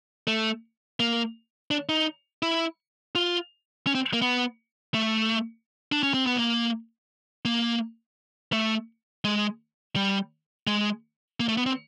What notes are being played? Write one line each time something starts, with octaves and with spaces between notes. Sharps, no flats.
A3
A#3
D4
D#4
E4
F4
C#4
C4
A#3
B3
A3
D4
C#4
C4
B3
A#3
A#3
A3
G#3
G3
G#3
A#3
A3
B3
C4